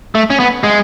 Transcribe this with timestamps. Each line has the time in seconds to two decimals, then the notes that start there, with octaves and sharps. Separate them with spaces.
0.15 A3
0.30 C#4
0.40 B3
0.64 G#3